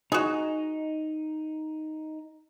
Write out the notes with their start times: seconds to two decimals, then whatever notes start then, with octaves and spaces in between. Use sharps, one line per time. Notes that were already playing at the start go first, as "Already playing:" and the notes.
0.12 D#4 F#4 G#4